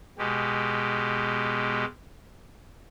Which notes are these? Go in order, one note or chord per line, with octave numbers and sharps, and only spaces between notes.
B2 G#3 G4